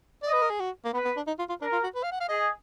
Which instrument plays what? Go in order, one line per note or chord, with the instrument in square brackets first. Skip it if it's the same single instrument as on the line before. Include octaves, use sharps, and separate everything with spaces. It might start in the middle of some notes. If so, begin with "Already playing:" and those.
[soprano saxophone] D5 [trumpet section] D#5
[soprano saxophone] B4
A#4
G#4
F#4
A#3
[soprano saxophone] B3 [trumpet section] B4
[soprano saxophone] B3
D4
D#4
F4
F4
[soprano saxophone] D4 [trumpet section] A#4
[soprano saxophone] F4
F#4
B4
F5
F#5
F5
[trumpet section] G#4 [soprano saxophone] D#5